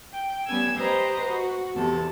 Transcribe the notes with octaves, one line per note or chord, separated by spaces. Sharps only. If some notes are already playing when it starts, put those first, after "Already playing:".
G5
G3 B3 C#4 G#5 E6 G#6
G4 B4 C5 D#5 A#5
F#4
E2 C3 A4 A5